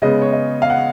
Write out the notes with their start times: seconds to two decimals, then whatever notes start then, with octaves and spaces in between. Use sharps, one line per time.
0.02 C#3 G#3 B3 D#5
0.22 C#5
0.32 D#5
0.62 F5
0.70 F#5